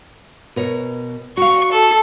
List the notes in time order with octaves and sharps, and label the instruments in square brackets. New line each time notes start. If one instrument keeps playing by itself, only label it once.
[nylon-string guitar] B2 A#4 C#5
[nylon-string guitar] F#4 F5 [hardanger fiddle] C#6
[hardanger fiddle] A4